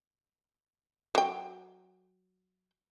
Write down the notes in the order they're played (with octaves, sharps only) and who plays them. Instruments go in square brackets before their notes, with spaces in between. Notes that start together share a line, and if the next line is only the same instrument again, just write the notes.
[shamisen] F#3 G5